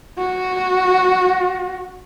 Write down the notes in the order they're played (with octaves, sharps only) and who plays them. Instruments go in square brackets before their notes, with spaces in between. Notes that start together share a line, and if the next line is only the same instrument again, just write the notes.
[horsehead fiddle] F#4